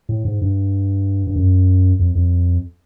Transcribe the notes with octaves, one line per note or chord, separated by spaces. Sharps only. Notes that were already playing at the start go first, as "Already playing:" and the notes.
A2
G#2
G2
G2
F#2
F2
F2